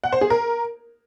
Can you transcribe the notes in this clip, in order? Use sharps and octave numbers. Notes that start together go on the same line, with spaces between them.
F#5
C5
G#4
A#4